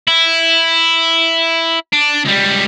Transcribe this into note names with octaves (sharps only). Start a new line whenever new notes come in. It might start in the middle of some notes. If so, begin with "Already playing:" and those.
E4
D4
C#2 G3